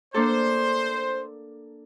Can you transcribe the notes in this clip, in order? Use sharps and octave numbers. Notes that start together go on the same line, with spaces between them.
A#3 D4 A4 C5